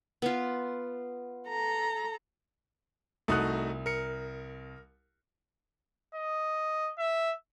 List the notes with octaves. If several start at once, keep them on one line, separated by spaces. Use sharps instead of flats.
B3 F4
A4 A#5
C2 A3 D#4 F#4 D#6 F#6
A#4 C#7
D#5
E5